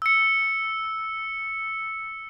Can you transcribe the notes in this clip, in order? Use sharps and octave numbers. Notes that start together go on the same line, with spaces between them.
E6 C#7